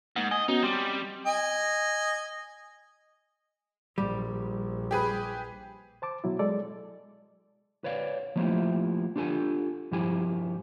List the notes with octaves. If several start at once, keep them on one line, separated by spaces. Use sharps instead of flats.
G#2 A#3 F#5
D#5 G#5
B3 C#4 D#4 F#4
G3 C4 C6 D6
D#5 G#5
A#1 G3
G4 G#4 B4
C5 A5 D6
B2 F#3 E4
G#3 A4 D5
B4 C#5 D5 F5
F3 A3 A#3 E4 F4 G4
D4 F4 G4 A4 G#5
G2 F3 E4 G4 G#5